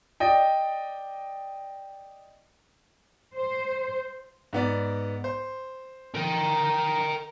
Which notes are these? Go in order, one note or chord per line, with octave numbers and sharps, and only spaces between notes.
D5 D#5 G5
C5
G#2 B3 D5
C5
A#4 G5